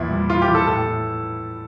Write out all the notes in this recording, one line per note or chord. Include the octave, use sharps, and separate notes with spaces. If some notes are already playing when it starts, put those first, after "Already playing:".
Already playing: E2 A#2 E4
G3
E3 F4
G4
E3
A4
A2 A4
A2